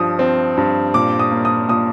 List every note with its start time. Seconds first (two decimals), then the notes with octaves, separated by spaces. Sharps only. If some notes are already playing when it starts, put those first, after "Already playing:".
Already playing: G2 F3 D#6
0.19 C4
0.57 G2
0.94 A#2 D6
1.19 D#6
1.32 A#3
1.45 D#6
1.69 A#2 D#6